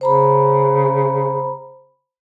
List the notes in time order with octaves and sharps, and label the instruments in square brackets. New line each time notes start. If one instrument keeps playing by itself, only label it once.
[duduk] C#3 [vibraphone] C5 A#5 B5